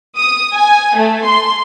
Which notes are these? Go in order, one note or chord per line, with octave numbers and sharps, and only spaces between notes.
D#6
G#5
A3
C6